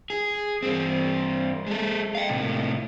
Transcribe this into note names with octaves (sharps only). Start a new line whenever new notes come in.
G#4
G2 C4
G#3 A4
F5 G5
A2 C3